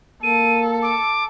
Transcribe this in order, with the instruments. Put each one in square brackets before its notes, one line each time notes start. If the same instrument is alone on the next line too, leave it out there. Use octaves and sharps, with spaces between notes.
[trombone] A#3 [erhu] A4 [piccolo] D#7
[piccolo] D6